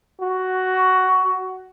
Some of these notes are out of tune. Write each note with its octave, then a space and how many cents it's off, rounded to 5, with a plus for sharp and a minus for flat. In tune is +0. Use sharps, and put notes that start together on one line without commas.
F#4 +10